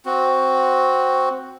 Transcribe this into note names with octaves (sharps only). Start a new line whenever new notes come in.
C4 F#4